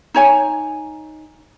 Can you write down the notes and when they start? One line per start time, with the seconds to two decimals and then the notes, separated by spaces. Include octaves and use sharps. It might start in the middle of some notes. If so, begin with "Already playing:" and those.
0.14 D#4 C#5 G#5